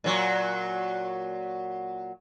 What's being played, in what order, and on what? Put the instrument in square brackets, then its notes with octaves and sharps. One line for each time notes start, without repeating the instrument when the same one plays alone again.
[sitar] A#2 F#3 F#4